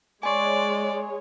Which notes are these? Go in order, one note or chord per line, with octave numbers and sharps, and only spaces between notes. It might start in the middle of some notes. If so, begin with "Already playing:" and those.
G#3 C#5 D5 G#5 C6 C#6